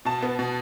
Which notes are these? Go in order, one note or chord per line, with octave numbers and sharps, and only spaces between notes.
B2 A5
B3
B2